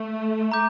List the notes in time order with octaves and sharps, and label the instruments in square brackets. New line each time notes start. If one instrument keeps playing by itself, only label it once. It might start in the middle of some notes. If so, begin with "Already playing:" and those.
Already playing: [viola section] A3
[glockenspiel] A#5 D6 G6